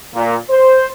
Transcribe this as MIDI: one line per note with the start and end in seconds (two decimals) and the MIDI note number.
0.15 0.36 46
0.50 0.87 72